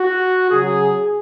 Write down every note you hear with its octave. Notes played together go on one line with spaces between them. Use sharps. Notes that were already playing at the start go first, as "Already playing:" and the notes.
Already playing: F#4
C#3 F#3 G#4